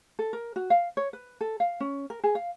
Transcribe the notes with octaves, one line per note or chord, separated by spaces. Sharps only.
A4
A#4
F#4
F5
C#5
B4
A4
F5
C#4
A#4
G#4
F5